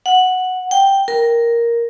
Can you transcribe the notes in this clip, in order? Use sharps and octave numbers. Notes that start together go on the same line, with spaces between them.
F#5
G5
A#4